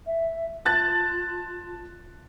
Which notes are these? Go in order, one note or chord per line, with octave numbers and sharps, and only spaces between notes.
E5
F4 A5 F#6 A6